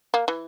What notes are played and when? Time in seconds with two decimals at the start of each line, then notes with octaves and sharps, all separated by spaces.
0.14 A#3
0.28 E3